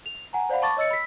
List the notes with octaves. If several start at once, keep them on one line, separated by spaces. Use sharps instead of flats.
F7
F#5 G#5 A#5
C5 D5 F5 F#5 B5
A5 B5 C#6 D6 A6
C#5 D#5 E6 A6 C#7
B5 E6 B6